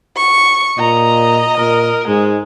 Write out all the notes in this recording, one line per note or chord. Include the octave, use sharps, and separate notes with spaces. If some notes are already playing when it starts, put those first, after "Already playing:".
C#6
A#2 D#5 A#5
A#2 A#4
G#2 G#3